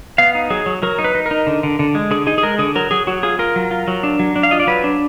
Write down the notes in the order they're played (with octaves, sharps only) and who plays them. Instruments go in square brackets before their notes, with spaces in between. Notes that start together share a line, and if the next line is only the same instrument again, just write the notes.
[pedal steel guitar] B3 F5
D#4
F#3 G#4
F#3
F#3 A#4
D#4
B4
D#4
A#4
D#4
D3
D3
D3
G#3
D3 G#4
D#4 G#4
G#4
G#3 A#4
D3 G#4
F#3 A#4
F#3 G#4
F#3 F#4
F4 G#4
F4 A#4
F#3
F4
F#3
D4
F#3
D4
F5
F4 D#5
D5
F#3 B4
D4